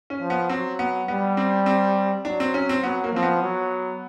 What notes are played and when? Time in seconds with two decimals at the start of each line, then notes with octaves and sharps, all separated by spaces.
0.10 C#4
0.20 F3
0.30 B3
0.49 F#3 C4
0.79 B3
1.08 G3 B3
1.37 C4
1.66 C4
2.25 F#3 D4
2.40 C4
2.54 C#4
2.69 C4
2.84 F#3 B3
3.04 A#3
3.14 F3 C4
3.23 B3
3.42 F#3